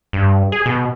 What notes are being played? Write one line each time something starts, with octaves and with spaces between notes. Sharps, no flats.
G2
G#4
B2